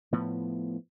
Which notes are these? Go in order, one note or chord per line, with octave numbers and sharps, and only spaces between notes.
A2 F3 B3